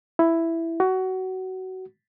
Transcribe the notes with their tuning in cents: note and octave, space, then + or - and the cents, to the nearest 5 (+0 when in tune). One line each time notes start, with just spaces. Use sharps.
E4 +5
F#4 +20